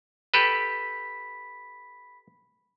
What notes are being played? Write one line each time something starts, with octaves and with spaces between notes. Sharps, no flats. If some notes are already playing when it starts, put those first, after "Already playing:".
G4 A4 B4 B5 B6